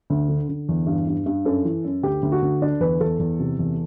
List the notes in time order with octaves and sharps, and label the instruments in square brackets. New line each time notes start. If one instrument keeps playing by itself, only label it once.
[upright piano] D2
D3
D3
E2
G2
G2
G2
F#2 A4
E3
F#2
D2 G4
D2
F#4
D2
D3 D4
E2 B4
E2 A4
E2
C3
E2